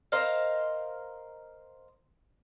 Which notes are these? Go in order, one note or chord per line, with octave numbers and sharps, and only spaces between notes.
A#4 C5 D#5 F5